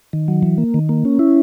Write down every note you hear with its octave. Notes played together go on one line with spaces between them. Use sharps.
D#3
F#3
E3
A#3
D#3
A#3
C#4
E4